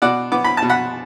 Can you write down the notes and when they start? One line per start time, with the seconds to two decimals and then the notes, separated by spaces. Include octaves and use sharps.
0.02 B2 D5 F#5
0.32 B3 D6
0.44 B5
0.57 B2 A5
0.69 F#5 B5